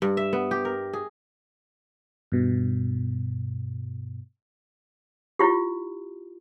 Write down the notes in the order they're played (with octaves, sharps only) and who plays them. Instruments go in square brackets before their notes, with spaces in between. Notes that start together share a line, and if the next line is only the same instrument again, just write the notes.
[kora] G2
E5
B3
G4
A#4
G#4
[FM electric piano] G2 B2
[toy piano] E4 F4 G4